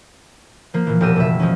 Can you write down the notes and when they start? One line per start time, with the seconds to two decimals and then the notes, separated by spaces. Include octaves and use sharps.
0.74 F3 A#3
0.87 A#2 E3
1.00 E1 E3 G4 A#4 E6 D#7
1.16 F#1 B2 E5
1.40 F3 G#3 C#4